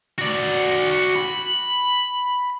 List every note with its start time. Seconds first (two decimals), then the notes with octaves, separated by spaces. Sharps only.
0.18 F#4 D5
1.16 B5